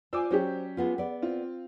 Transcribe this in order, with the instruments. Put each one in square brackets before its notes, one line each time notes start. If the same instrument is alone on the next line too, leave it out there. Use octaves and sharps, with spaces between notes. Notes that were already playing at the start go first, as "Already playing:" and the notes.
[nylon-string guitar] F4 C5 D5 [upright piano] G#5 D6 E6
[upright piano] F#3 C#4 G4 [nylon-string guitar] C5
[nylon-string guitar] G#3 B3 F4
B3 D5
[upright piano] C4 F4